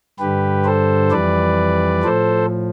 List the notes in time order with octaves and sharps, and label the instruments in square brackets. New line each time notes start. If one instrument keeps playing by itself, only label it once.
[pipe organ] G2 D3 G3 G4 B4
A4 C5
F2 E3 G3 B4 D5
A2 F3 A4 C5